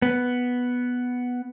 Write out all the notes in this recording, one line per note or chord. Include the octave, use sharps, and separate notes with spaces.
B3